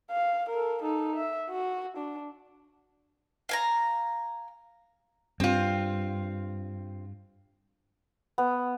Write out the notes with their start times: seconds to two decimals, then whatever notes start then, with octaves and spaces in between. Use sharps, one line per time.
0.10 F5
0.50 A4 A#4
0.83 D#4 A4
1.16 E5
1.50 F#4
1.97 D4
3.49 F5 G#5 A#5
5.40 G2 C4 F4
8.38 B3